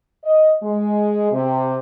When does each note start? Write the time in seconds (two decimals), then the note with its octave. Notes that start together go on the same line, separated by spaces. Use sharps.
0.24 D#5
0.62 G#3
1.31 C3